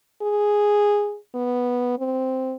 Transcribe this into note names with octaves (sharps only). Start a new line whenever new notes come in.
G#4
B3
C4